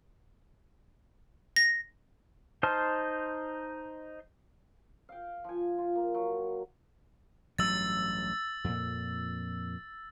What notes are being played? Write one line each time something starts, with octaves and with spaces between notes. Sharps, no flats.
A#6
D#4 C5 A5 C6 F6
F5 G5
F3 G#5
F4
A#3
F#3
A1 G2 F#3 E6 A6
F2 A#2